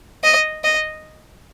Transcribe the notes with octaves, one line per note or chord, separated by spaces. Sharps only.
D#5
D#5